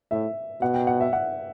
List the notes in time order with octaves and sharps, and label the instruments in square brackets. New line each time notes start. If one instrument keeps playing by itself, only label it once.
[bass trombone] A2 [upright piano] E5
[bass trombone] B2 [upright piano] F#5
[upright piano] G5
F#5
E5
F#5